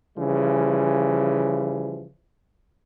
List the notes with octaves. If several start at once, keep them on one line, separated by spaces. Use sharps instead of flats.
C#3 E3 F3 G3